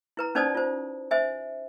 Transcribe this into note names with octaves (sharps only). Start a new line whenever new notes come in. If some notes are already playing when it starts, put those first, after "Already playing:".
E4 B4 A#5
C#4 D#4 C5 D5 A5 D#6
F4 C5
C5 E5 G#5